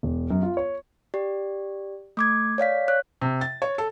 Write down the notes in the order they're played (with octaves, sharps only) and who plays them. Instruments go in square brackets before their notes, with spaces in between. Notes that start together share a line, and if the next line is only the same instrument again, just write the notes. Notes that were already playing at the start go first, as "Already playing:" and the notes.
[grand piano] E1
F#2
F4
C#5
[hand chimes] G4 D5
A3 D6 G#6
C#5 D5 F5 B6
C#5 F#6
[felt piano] C3
A6
C#5
A4